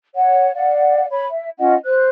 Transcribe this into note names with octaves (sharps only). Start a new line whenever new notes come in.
C#5 F#5
D5 F5 F#5
C#5 B5
E5
C#4 F4 D#5 F#5
C5 F#6